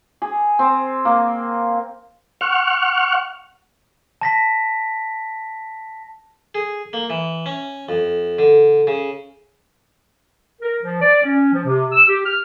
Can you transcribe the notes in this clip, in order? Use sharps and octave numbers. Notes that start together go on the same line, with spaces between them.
G#4
C4
A#3
F#5 C#6 F6
A5 A#6 B6
G#4
A#3
E3
C#4
F2
D3
C#3
A#4
F3
D5
C#4
F3
C3
E6
G4
F6